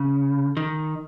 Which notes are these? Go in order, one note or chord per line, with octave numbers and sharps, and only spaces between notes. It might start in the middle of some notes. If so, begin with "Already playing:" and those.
Already playing: C#3
D#3